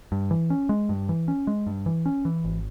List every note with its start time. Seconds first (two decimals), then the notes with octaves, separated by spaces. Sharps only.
0.12 G2
0.31 E3
0.50 C#4
0.69 G#3
0.89 G2
1.09 E3
1.28 C#4
1.47 G#3
1.67 G2
1.86 E3
2.06 C#4
2.25 E3
2.44 G#1